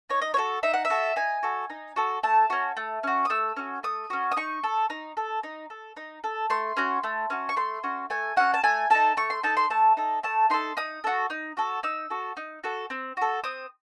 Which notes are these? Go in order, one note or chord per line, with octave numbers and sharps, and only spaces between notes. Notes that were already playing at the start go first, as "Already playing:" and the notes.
D#4 C#5
D#5
C#5
F#4 A4
D#4 E5
F#5
E5
F#4 A4
D#4 G#5
F#4 A4
D#4
F#4 A4
A3 A5
C#4 F#4
A3
C#4 F#4
D#6
A3 E6
C#4 F#4
A3 D#6
C#4 F#4
D#6
D#4 C#6
A4
D#4
A4
D#4
A4
D#4
A4
A3 C6
C#4 F#4
A3
C#4 F#4
C#6
A3 C6
C#4 F#4
A3 G#5
C#4 F#4 F#5
A5
A3 G#5
D#4 A4 A5
A3 C#6
C6
D#4 A4 A5
C6
A3 A5
D#4 A4
A3 A5
D#4 A4 C6
D#4 D#6
F#4 A4
D#4
F#4 A4
D#4 E6
F#4 A4
D#4
F#4 A4
C4
F#4 A4
C4 D#6